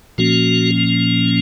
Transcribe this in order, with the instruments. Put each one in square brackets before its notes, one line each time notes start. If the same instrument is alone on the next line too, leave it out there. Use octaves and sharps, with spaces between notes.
[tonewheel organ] A#2 F3 A#3 C#4 F#4